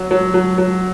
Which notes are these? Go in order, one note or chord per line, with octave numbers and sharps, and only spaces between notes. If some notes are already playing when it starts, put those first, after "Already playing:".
Already playing: F#3
F#3
F#3
F#3